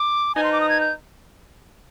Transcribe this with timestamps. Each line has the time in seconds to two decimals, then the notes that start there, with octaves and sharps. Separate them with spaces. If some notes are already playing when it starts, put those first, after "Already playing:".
Already playing: D6
0.35 F3 B3 D#4 G#5
0.44 C6
0.52 D6
0.61 D#6
0.69 G#6
0.81 G6